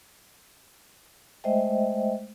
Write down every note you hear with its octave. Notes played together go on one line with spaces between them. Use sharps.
G#3 A3 C5 D#5 E5 G5